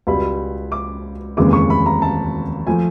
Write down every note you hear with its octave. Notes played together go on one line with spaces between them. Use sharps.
C#2 B2 G3 B5
D6
F1 D#2 C#3 E3 G#3 D6
C#6
B5
A#5
A5
F3 A3 G#5